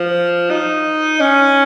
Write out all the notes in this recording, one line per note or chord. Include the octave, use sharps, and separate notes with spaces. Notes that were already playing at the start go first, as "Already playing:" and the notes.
Already playing: F3
D#4
C#4